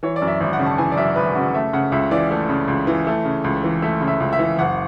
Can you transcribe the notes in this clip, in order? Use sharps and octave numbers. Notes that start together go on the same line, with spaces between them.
E3 C#5
D5
F#2
E5
G#1
F#5
C#3
A5
E3 G#5
D5
F#2 E5
G#1 B4
C#3 F#4
A3 E5
C#3 F#5
C#2 E5
E3 D5
A3
C#3
C#2
E3
A3
C#3
C#2
E3
A3 E5
C#3
E5
C#2
E5
E3
F#1 F#5